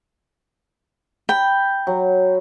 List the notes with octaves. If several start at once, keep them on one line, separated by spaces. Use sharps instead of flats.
G5 B5
F#3